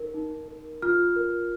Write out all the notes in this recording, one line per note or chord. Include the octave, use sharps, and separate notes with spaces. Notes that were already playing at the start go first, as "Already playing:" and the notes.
Already playing: D#4 A#4
D#4
A#4
F4 F6
A#4